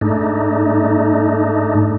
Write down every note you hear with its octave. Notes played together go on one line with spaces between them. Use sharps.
G#2 A3 D4 D#4